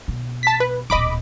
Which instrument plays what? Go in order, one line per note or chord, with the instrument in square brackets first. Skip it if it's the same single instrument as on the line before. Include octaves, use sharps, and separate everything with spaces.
[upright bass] B2
[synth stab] A5 B6
B4
[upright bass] D1 A#2 [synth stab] D#5 B5 D6